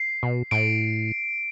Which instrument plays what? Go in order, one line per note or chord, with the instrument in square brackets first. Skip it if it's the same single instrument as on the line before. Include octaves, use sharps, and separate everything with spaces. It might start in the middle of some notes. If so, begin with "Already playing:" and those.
Already playing: [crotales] C7
[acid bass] B2
[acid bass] A2 [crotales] D7